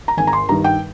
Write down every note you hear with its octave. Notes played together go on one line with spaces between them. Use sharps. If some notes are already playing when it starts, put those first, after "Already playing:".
A#5
G#1 G#5
A#5
C6
G2 D#3 A#5
G5